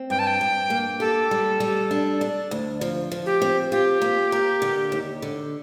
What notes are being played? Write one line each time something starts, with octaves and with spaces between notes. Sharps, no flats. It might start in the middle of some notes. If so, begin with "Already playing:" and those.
Already playing: C4
G2 G5
A5
G5
G2
A#3
G4 A4
G3
G3
D4
D4
D2
F3
F3
G4
C4
F4 G4
A#3
A#4
D3
D#2
D3